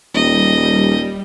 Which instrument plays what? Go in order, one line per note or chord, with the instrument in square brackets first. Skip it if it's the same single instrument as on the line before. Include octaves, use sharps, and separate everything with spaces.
[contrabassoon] D#1 [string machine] G3 [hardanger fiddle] D#5